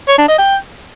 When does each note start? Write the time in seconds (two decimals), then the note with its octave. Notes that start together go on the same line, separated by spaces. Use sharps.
0.08 C#5
0.18 D4
0.28 D#5
0.38 G5